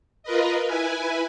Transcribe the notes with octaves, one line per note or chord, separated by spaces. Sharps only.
F4 A#4 B4 D#5
E4 B4 G#5